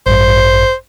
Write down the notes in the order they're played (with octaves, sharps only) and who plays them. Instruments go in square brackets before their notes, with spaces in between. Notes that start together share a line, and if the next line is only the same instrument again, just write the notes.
[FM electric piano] A1 G2 [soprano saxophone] C5